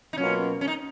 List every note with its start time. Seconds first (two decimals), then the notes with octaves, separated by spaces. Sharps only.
0.13 D#4
0.18 B2 F#3 A#3 C#4 F4 A#4
0.61 C#4
0.68 D#4